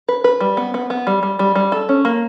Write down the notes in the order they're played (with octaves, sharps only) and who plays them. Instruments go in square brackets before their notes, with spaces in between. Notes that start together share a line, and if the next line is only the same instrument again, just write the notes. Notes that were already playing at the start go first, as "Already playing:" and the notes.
[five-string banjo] B4
B4
G3
B3
B3
B3
G3
G3
G3
G3
A4
C#4
A#3